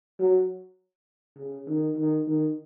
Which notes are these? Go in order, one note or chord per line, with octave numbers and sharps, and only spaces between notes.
F#3
C#3
D#3
D#3
D#3